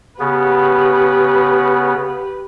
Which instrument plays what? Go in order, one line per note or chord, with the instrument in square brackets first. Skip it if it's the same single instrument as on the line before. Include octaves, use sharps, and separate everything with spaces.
[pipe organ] C#3 B3 [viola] G4 B4